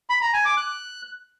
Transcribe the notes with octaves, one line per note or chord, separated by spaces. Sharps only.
B5
A#5
G#5
D6
F#6